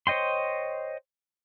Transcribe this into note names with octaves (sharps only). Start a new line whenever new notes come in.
C5 C#5 D#5 G5 C6